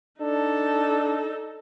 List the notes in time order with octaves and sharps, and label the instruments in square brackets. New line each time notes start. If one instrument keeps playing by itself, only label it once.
[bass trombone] D4 [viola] D#4 A4